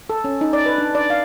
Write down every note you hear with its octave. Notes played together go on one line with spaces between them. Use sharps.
A4
C#4
D#4
D5
B4
D4
D5
F5